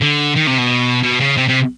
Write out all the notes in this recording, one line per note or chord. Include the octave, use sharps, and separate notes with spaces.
D3
D#3
C3
B2
B2
C#3
C3
C3